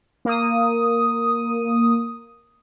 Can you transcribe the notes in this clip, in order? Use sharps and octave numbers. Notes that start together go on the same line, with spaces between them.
A#3 D#6